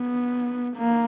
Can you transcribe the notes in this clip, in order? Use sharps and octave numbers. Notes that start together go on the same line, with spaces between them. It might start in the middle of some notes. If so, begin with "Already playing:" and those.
Already playing: B3
A#3